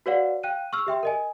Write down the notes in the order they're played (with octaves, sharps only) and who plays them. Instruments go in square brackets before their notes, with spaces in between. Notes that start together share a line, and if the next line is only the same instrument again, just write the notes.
[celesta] F#4 B4 C#5 D5 F5 F#5
F5 G5 F#6 D#7
C#6 E6 F6
G4 E5 G5 C6
A#4 D#5 G#5